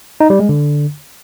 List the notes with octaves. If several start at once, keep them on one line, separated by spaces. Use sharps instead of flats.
D#4
G3
G#3
D3